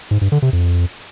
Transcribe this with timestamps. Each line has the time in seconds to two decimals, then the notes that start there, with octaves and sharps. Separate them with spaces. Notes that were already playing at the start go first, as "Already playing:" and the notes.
0.11 G#2
0.21 G2
0.32 D3
0.42 C3
0.53 F2